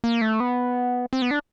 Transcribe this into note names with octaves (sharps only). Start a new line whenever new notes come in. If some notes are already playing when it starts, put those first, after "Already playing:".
A#3
A3
B3
C4
B3
D4